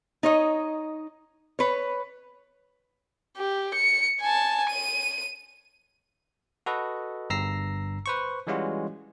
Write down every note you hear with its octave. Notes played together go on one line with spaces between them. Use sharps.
D#4 C#5 D#5
B4 C#5
G4
C#7
G#5 A5
D#7
F#4 A4 B4 D#5
G1 G2 A#5 E6 A#6 C7
B4 C5 C#6
E3 G3 G#3 C#4 F4 F#4